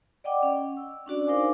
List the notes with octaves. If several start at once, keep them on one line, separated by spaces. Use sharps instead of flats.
D5 D#5 F#5 G5 D6
C#4
E6
C#4 D4 F#4 D5
D#4 A#4 C5 F5 G#5 D6